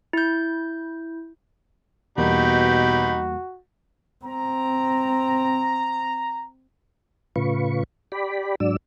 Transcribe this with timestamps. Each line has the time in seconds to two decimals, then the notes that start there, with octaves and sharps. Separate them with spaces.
0.13 E4 G6
2.18 E2 B2 G3 A#3 D#4 F#4 G4 B5
4.25 C4 A#5
7.36 A2 C#3 F4 B4 C#6
8.12 G4 D5 B5
8.60 G#2 F#3 D4 D5 E6